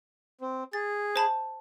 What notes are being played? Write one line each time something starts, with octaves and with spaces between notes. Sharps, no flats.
C4
G#4 A6
C5 A5 B5